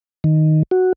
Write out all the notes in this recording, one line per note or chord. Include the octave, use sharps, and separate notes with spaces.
D#3
F#4